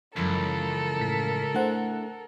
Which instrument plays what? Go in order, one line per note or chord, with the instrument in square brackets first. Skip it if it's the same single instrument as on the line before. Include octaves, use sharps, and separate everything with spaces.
[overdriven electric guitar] C#2 [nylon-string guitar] F#2 E3 F3 [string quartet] A4 A#4
[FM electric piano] A2 B6
[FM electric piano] A3 F#5 [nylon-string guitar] D4 E4 C5